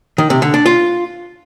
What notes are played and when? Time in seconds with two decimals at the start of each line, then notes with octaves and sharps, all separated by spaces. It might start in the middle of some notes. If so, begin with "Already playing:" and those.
0.18 D#3
0.30 C3
0.42 D3
0.54 D4
0.66 F4